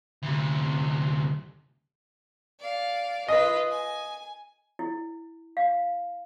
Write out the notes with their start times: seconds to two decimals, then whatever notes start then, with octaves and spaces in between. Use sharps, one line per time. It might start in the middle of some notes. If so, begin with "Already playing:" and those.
0.23 D2 C3
2.59 D5 F5
3.28 F4 B4 D#5
3.70 G#5
4.79 E4
5.57 F5